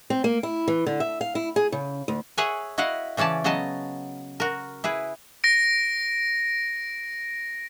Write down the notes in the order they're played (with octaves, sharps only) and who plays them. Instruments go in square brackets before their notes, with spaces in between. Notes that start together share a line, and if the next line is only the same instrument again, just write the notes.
[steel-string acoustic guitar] C4
A#3
E4
E3
D3
E5
F5
E4
G#4
C#3
D2
[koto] G#4 C#5 E5 F#5 G#5
E4 F#4 D#5 F5 F#5
C#3 E3 C#4 D5 A5
C#3 F#3 B3 D#5 A5
F#4 A#4
E4 G#4 B4
[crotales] A#6 D7